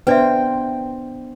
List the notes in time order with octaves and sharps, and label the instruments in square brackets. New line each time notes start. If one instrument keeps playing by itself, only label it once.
[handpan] B3 D4 C5 [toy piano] B4 D5 E5 [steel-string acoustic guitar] G5